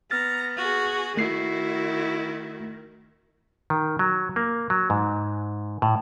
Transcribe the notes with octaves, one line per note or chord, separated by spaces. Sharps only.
B3 A#5 F6 A6
F#4 G#4
D#3 A3 E4 F#4 C7
D#3
F#3
A#3
F#3
G#2
A2